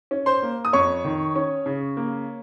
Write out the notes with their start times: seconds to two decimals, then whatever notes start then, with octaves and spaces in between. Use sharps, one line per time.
0.11 C#4
0.26 C5 C6
0.43 A#3
0.65 D#6
0.73 F2 C#5 C#6
1.05 D#3
1.36 C#4
1.66 C#3
1.97 A#3